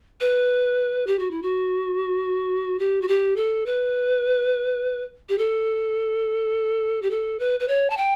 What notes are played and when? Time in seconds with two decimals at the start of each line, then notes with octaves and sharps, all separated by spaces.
0.20 B4
1.07 G4
1.19 F#4
1.31 E4
1.42 F#4
2.79 G4
3.02 F#4
3.08 G4
3.36 A4
3.66 B4
5.29 G4
5.38 A4
7.02 G4
7.11 A4
7.39 B4
7.60 B4
7.68 C#5
7.90 A5
7.97 G5